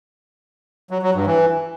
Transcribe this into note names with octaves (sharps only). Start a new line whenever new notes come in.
F#3
F#3
G2
E3